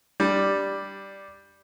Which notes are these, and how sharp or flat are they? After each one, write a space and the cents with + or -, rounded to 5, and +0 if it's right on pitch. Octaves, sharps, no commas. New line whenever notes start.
G3 +0 D4 +0